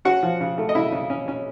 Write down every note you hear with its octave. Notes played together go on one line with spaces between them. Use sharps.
C#4 F#4 F#5
F3
C#3
A3
D#5
C#3 E4 E5
C#3
C#4
C#4